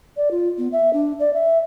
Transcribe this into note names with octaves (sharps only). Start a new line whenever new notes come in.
D5
F4
B3
E5
D4
D5
E5